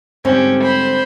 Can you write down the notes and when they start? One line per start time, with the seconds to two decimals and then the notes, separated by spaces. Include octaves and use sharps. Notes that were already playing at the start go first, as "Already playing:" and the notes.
0.25 G#2 D3 G3 C4 C#4 G4
0.61 C5 B5